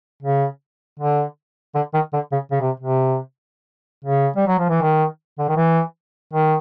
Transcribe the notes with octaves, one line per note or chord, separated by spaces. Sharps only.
C#3
D3
D3
D#3
D3
C#3
C#3
C3
C3
C#3
G3
F#3
F3
E3
D#3
D3
D#3
E3
D#3